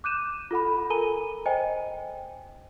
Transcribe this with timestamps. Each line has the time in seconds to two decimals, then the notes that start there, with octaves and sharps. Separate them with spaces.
0.04 D6 F#6 G6 D#7 E7
0.51 F4 A4 F#5 B5
0.90 A4 A#4 G#5 A#5 D#7 G7
1.46 C5 D#5 G5 G#5